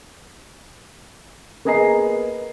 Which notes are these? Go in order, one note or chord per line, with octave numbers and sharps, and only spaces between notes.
A#3 B3 G#4 D#5 A#5 C7